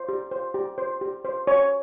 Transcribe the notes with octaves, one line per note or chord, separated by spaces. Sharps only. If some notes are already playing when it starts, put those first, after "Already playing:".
Already playing: C5
G4
C5
G4
C5
G4
C5
C#5